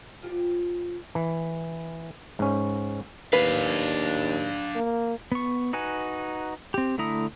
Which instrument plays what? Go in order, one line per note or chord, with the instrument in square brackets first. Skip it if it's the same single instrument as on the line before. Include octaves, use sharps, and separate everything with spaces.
[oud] F3 F4 G4
[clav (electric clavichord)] E3
G#2 C#4
[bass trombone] D#2 [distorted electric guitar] D4 F5 [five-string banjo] B4
[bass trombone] A#3
[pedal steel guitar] B3 C#6
D#4 F#4 B4 G#5
C4 G4
D3 A3 E4 A#5 D#6